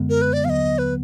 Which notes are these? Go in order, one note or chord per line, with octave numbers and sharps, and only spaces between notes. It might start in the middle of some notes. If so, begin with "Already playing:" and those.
Already playing: F#2 D3 G#3 B3
A#4
B4
D5
D#2 D3 F#3 B3 D#5 F5
B4